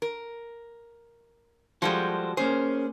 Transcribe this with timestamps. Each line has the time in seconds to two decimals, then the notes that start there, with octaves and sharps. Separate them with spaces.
0.02 A#4
1.82 F3 G3 G#3 F#4 A4 C5
2.37 A#3 C#4 G#4 C5